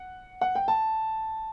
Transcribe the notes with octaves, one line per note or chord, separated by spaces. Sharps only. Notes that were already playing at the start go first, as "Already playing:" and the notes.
Already playing: F#5
F#5
G5
A5